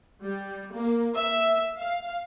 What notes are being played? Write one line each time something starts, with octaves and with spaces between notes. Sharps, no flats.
G3
A#3
E5
F5